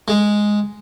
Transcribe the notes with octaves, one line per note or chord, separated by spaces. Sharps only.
G#3